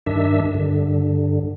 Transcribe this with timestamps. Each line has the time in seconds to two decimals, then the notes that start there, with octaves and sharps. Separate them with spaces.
0.06 G2 D#3 D4 E5
0.54 G2 D3